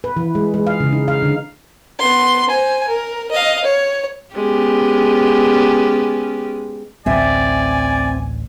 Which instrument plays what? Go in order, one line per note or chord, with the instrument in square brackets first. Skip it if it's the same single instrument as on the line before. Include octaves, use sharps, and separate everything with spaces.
[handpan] B4
E3
G#3
G#3
F5
C#3
D#4
F5
D3
[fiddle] B3 C6
C5 G#5
A#4
D#5 F5
C#5
[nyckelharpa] G#3 [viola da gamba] B3 C#4 G4
[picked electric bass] A1 D2 [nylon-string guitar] C4 E5 [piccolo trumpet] D5 [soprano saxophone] G#5